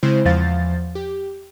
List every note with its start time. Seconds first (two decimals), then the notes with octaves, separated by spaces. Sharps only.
0.03 C#3 G#3 C4 E4 C5
0.25 E2 F3 C5 F5 A6
0.95 G4